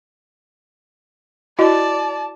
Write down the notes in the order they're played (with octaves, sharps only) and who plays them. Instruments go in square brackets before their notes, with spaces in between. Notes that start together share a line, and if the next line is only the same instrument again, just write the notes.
[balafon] E4 F#4 D#5 [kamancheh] D5 A5